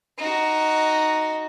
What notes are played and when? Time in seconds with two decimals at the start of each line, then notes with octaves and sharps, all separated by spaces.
0.18 D#4 F#4